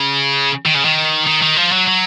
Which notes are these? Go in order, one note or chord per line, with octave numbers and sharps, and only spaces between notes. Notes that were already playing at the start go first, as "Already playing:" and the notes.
Already playing: C#3
D#3
C#3
D#3
D#3
D#3
F3
F#3
F#3